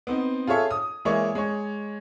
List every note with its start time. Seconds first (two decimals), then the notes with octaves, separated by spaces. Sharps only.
0.07 B3 C4 D#4
0.47 F4 G#4 A4 C#5 E5
0.71 D#6
1.05 E3 G#3 A#3 E4 C#5 D5
1.35 G#3 C#5